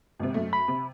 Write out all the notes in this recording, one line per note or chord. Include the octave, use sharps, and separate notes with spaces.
G#1 G#2 C3
F#2 A3
B5
C3